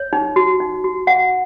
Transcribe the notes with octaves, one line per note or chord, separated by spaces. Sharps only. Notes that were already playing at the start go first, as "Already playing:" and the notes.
Already playing: C#5
D#4
F#4
D#4
F#4
F#5